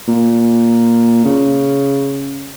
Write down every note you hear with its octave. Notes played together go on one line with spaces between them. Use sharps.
A#2
C#3